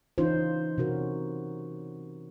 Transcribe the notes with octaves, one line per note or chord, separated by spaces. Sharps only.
E3 C#4 D#4 F4 C5
C3 C#4 F#4 A#4